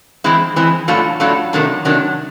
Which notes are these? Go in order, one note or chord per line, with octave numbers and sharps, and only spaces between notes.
E3 G#3 C4 E4
E3 G#3 C4 E4
A2 F#3 A3 D4 F4
A2 F#3 A3 D4 F4
C3 D#3 F#3 A3 D4
C3 D#3 F#3 A3 D4